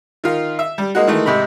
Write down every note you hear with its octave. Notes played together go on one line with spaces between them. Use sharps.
D#3 F4
E5
G3
G#3 A#3 D#4 F#4
D#3 E3 G#3 A3
G#2 C3 D#4 B5